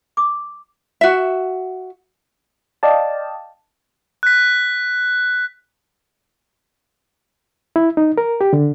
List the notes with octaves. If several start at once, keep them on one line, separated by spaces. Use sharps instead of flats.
D6
F#4 E5
D5 D#5 F5 G5 A5
F#6 B6
E4
D#4
A#4
G4
D3